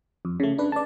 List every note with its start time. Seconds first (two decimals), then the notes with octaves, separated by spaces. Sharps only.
0.25 F2
0.40 C#3 A3
0.58 D4 B4
0.72 D5 A5